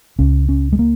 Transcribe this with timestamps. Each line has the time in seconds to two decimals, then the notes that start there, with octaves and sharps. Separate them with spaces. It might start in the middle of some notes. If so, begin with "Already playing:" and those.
0.19 C#2 C#3 C#4
0.49 C#4
0.73 G#3
0.79 A#3